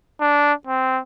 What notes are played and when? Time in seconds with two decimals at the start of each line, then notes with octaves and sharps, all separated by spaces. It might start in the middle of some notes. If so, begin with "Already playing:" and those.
0.21 D4
0.67 C4